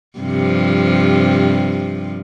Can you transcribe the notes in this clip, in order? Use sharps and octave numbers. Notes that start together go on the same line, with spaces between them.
G2 C3 F3